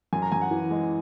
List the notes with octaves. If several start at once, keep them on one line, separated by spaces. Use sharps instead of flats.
F#2 G#5
A#5
F#2 G#5
F#5
E3
G#3